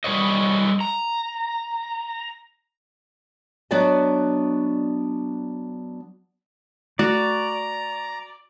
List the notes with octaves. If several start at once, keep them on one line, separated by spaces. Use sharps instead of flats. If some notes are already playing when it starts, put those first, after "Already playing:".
F#3 G3 A4 B4 C#5 D#5
A#5
F#3 B3 D4 F#4 D5 D#5
A3 F#4 D5 A#5